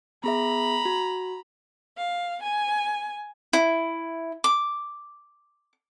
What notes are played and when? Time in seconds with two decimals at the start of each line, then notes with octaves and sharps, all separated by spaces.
0.24 B3 G#4 E5 A#5 B5
0.85 F#4
1.96 F5
2.40 G#5
3.53 E4
4.44 D6